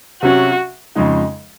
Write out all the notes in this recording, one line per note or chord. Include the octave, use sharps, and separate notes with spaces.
C3 F#3 C#4 F#4
F2 C#3 G#3 D#4